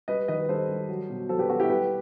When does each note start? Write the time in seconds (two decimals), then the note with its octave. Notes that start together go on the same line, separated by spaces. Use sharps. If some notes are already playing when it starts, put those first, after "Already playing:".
0.08 G3 B4 D#5
0.28 D#3 B4 D#5
0.49 G3 A4 C5
0.69 G3
0.89 F#3
1.10 B2
1.29 F#3 A4 C5
1.39 G4 B4
1.49 B3 F#4 A4
1.59 E4 G4
1.70 G3 G4 B4